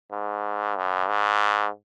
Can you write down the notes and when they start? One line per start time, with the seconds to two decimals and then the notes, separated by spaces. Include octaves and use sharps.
0.12 G#2
0.76 F#2
1.08 G#2